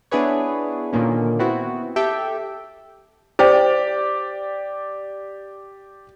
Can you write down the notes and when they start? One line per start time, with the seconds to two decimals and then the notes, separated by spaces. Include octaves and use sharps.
0.11 B3 D4 E4 G#4 B4 C#5
0.93 A#2 D3 D#3 A#3 C#4
1.39 B3 C4 E4 F#4
1.96 G4 A4 E5 G5
3.39 E4 G4 C5 D5 G5